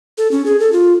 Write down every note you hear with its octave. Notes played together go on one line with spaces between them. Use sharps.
A4
C#4
G#4
A4
F4